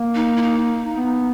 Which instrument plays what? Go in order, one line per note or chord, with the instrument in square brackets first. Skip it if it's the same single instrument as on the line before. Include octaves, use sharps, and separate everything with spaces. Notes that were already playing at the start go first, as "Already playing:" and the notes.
Already playing: [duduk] A#3
[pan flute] D#4
E4
D#4
[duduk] B3